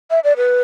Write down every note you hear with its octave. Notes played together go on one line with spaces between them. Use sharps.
E5
D5
B4